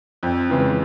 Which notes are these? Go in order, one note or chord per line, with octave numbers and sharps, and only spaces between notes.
F2
C#3 E3 G#3